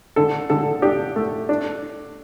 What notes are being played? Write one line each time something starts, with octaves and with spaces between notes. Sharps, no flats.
D3 A4
D3 A4
D4 G4
A3
D4